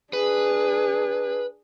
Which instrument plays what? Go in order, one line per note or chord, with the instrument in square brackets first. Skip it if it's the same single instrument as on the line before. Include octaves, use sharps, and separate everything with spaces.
[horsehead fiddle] D4 G#4 [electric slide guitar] B4